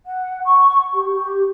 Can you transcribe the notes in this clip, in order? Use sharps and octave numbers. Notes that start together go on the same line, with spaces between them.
F#5
C#6
G4
G4